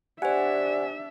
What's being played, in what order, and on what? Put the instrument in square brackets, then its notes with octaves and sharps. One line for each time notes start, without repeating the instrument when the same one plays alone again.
[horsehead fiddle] D4 E5 [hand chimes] G4 C5 [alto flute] D5 [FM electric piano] F#5 G#5